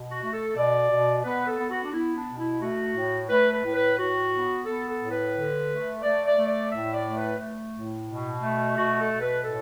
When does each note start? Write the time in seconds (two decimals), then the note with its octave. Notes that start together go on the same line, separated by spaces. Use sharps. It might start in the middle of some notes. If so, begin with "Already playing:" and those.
Already playing: B2
0.10 F#4
0.22 A3
0.33 A4
0.56 B2 D5
0.90 B2
1.24 B3 B4
1.47 A4
1.59 B3
1.70 F#4
1.84 D4
1.92 B3 E4
2.15 D4
2.27 B2
2.38 E4
2.60 A3 F#4
2.95 A2
3.30 A3 B4
3.52 B4
3.64 A2
3.75 B4
3.98 A2 F#4
4.31 B3
4.66 B3 A4
4.89 A4
5.00 A2
5.11 B4
5.34 D3
5.69 A3
6.02 A3 D5
6.25 D5
6.37 A3
6.48 D5
6.70 A2 E5
6.94 D5
7.04 A3
7.17 B4
7.39 A3
7.74 A2
8.07 B2
8.42 A3
8.76 B2 F#4
8.99 A4
9.10 B2
9.21 B4
9.44 A2 A4